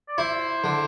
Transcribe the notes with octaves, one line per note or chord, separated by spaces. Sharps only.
D5
E4 C5
D3